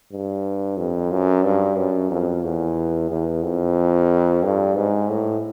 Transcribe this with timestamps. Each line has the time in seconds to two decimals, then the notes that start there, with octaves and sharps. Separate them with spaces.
0.12 G2
0.77 F2
1.11 F#2
1.44 G2
1.77 F#2
2.10 F2
2.43 E2
3.10 E2
3.43 F2
4.44 G2
4.77 G#2
5.10 A2